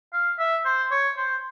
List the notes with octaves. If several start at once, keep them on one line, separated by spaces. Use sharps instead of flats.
F5
E5
C5
C#5
C5